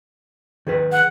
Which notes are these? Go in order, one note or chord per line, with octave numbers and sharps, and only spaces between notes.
D#3 G#4 B4
F#5